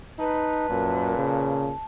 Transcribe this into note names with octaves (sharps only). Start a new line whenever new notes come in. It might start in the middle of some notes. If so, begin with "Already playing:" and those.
D#4 B4 A5
F#2 A#2
C#3